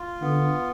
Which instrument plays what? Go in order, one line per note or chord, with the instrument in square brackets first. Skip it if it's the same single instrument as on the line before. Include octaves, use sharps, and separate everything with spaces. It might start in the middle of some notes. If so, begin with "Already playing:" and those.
Already playing: [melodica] F4
[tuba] D3 [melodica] B3